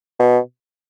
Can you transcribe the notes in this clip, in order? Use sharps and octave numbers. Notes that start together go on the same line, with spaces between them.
B2